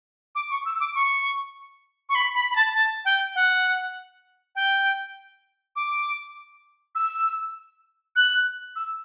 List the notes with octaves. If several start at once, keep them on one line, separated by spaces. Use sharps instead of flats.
D6
C#6
E6
D6
C#6
C#6
B5
B5
B5
A5
A5
G5
F#5
G5
D6
E6
F#6
E6